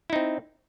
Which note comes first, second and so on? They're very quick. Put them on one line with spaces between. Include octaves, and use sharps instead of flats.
E4 D#4 C4